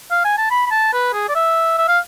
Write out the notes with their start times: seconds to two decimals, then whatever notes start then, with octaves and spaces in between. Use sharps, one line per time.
0.11 F5
0.25 G#5
0.38 A5
0.51 B5
0.66 B5
0.71 A5
0.93 B4
1.13 G#4
1.29 D5
1.35 E5
1.78 E5
1.88 F5